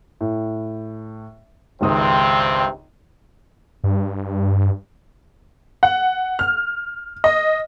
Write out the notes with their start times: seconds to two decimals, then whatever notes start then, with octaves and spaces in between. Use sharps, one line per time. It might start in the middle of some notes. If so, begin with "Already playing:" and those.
0.21 A2
1.81 G#1 C#2 G2 C3 C4 D#6
3.84 G2
5.83 F#5
6.39 F6
7.24 D#5